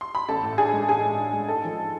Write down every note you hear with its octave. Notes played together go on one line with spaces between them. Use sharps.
C6
B5
A1 A4 A5
A2
D4 G#4 G#5
G#3
A1 G#4 G#5
A2
D4
G#3
G#2 A4 A5
F3